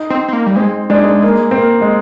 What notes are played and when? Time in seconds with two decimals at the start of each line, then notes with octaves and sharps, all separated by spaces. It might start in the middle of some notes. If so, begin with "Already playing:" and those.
Already playing: D#4
0.10 C4
0.28 C4
0.33 A#3
0.46 G3
0.56 G#3 C4
0.90 G#3 D4
0.97 D#4
1.04 D4
1.23 A#3
1.51 C4
1.58 A#3
1.81 G#3